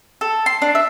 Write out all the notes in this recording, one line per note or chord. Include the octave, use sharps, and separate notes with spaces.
A4
C6
D4
E5